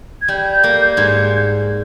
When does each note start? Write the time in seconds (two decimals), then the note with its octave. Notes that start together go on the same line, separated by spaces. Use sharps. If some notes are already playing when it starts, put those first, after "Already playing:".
0.22 G#6
0.28 G3 G6
0.64 A#3
0.97 G#2 G#6
1.08 G6